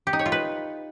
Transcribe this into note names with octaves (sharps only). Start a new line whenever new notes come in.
G4
D#4
C#5
F4
B4